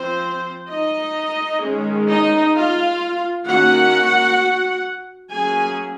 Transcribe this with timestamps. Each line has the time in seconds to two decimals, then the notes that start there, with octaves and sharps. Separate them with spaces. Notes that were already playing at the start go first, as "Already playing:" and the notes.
Already playing: F3 C4 C5
0.71 D#4 D#5
1.63 D#3 G#3 C#4
2.09 D#4 D#5
2.55 F4 F5
3.47 D#3 A#3 C#4 F#4 F#5
5.32 F#3 A#3 C#4 G#4 G#5